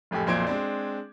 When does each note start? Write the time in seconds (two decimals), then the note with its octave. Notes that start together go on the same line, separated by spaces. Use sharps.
0.11 F#1 F2 A2 G4 G#5
0.26 B1 F2 A#2 C5 G#6 D7
0.47 G#3 C4 D4